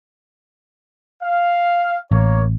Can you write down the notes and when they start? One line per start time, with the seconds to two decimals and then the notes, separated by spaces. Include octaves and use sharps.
1.23 F5
2.11 A1 A#3 C#5